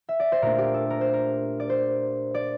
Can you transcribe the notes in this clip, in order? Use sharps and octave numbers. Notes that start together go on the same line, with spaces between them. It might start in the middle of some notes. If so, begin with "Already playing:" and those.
E5
D5
C5
A#2 A3 D4 A#4
G4
A4
A#4
C5
A#4
D5
C5
D5